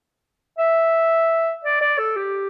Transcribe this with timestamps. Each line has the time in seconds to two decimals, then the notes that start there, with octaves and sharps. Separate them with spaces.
0.58 E5
1.64 D5
1.81 D5
1.98 A4
2.16 G4